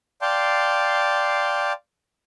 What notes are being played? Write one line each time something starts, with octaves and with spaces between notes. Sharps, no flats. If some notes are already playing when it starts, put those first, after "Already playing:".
D5 F5 G5 A5 C6